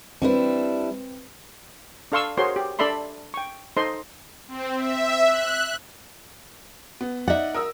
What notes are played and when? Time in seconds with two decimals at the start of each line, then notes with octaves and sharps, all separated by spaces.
0.22 G3 C4 D4 E4 B4
2.12 D4 A4 F5 C6 C#6 E6
2.37 F#4 G#4 A#4 C5 C#5 C6
2.56 G4
2.79 D4 A4 D5 E5 B5 C6
3.34 G5 C#6
3.77 D#4 A4 C5 D#5 C6
4.48 C4
4.76 E5
5.25 F#6
7.01 B3
7.28 D#4 D5 E5 F#5
7.55 A#4 D#6 E6